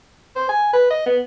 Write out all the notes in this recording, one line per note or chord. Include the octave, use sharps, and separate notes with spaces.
C5
G#5
B4
D#5
B3